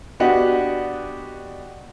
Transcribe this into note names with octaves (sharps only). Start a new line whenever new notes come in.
B3 D4 F#4 G4 D#5 F#5